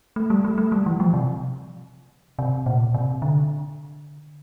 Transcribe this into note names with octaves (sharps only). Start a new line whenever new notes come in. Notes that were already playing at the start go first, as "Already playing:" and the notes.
A3
G3
A3
A3
G3
E3
F3
C3
C3
A#2
C3
D3